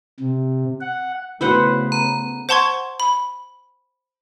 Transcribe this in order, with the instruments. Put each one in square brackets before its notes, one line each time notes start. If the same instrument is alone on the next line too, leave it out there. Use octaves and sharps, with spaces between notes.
[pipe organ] C3
F#5
[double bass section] C#3 A3 B3 [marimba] E4 F#4 [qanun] B4 C5 F#5
[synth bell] A#5
[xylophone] C5 F#5 A5 C6 C#6 G#6
B5